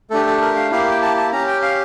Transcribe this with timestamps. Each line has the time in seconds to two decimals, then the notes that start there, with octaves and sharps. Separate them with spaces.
0.10 A3 D4 G4 A4
0.26 A4
0.42 A#4
0.56 F5
0.71 A#3 E4 G4 F5
0.91 G5
1.02 A5
1.17 A5
1.32 C#4 G4 A#5
1.47 G5
1.62 F5